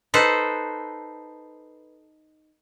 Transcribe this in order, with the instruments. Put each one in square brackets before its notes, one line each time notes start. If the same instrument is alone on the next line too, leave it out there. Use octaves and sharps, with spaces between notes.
[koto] D#4 A4 B4 C5